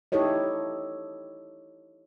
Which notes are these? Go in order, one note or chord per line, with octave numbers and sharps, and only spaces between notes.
D#4 E4 G4 A4 C#5 D#5